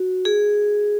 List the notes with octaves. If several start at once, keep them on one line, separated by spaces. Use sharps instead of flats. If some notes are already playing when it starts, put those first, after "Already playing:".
Already playing: F#4
G#4